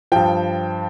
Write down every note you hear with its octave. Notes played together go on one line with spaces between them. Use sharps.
G2 F3 G5